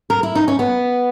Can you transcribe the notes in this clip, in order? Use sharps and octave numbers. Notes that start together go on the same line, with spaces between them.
A#4
E4
D#4
C#4
B3